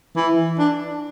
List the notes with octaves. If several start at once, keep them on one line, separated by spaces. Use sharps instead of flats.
E3
D4